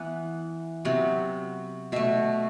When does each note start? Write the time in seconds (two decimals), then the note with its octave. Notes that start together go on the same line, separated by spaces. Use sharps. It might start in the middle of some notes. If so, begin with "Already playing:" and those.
Already playing: E3 B3 F#5
0.85 C3 F#3 B3
1.92 B2 A3 E5